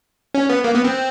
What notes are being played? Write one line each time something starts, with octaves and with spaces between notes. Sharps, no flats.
C#4
B3
A#3
B3
C4